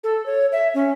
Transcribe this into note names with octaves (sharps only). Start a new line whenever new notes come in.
A4
C#5
E5
C#4